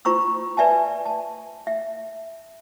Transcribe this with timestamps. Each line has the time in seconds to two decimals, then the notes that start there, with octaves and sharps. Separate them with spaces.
0.05 F4 C5 A#5 C#6 E6
0.57 B4 D5 E5 G#5 A5
1.06 A5
1.67 E5